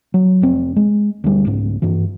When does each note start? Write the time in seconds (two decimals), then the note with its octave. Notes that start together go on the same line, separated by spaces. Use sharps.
0.14 F#3
0.42 F1 C4
0.76 G#3
1.24 D2 G3
1.45 C2 G#2
1.82 G2 E3